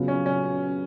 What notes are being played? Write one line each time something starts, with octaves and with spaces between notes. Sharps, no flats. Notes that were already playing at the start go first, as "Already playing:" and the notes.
Already playing: C#3 F#3 B3 F4
C#4
C#4